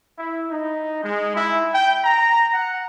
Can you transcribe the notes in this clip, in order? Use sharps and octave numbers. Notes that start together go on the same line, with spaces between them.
E4
D#4
G#3
E4
G5
A#5
F#5